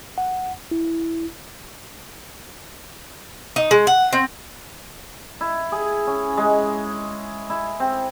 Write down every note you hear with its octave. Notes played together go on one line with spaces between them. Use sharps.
F#5
E4
D#4
G#3
F#5
C4
E4
G#4
C#4
G#3
E4
C4